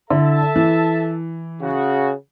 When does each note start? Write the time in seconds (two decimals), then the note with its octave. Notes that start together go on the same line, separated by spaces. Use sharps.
0.11 D3 E4 A4 E5 A5
0.56 E3
1.62 C#3 F#4